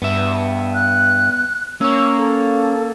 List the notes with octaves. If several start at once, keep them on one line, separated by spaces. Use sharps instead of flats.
G2 B3 E5
F#6
A#3 C#4 C#5 E6
A4